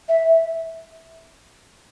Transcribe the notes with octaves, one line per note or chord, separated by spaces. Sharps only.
E5